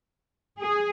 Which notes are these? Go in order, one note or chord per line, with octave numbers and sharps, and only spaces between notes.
G#4